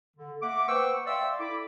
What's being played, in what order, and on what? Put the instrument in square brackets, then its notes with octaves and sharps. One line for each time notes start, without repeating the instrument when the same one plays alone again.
[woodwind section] D3
A#3 E5 F#5 D6
B4 C5 F#5 G5 C#6 E6
D5 E5 F5 G5 C6 E6
E4 A4 B5 D6